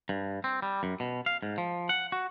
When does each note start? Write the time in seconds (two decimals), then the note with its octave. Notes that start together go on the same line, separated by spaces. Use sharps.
0.09 G2
0.44 C4
0.62 G3
0.83 F#2
1.00 B2
1.26 F5
1.43 G#2
1.58 F3
1.89 F#5
2.12 F#4